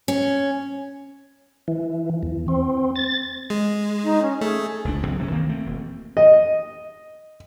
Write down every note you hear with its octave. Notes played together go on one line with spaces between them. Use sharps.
C#4
E3
E2
C4
A6
G#3
D#4
C#4
A3 G#4
F1 C#2 F3 D4
C#2 F#3 C4
C3 C4 C#4
D#3 A#3 C4
A3 A#3 C4
E1
D#5